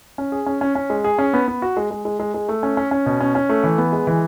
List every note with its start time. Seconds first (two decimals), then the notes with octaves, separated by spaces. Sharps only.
0.18 C#4
0.32 G#4
0.46 C#4
0.61 C#4
0.75 C#4
0.90 G#3
1.04 G#4
1.19 C#4
1.33 B3
1.48 B3
1.62 F#4
1.77 G#3
1.91 G#3
2.05 G#3
2.20 G#3
2.34 G#3
2.49 A3
2.63 C#4
2.77 C#4
2.91 C#4
3.06 B2
3.20 C#4
3.35 C#4
3.49 A3
3.64 E3
3.78 B3
3.93 G#3
4.07 E3